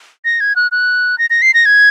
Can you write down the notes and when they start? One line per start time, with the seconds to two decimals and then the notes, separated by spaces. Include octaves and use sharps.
0.25 A#6
0.40 G#6
0.56 F#6
0.72 F#6
1.18 A#6
1.30 A#6
1.42 C7
1.54 A#6
1.66 G#6